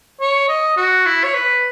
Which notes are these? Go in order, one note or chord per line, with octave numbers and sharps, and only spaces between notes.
C#5
D#5
F#4
E4
C#5
B4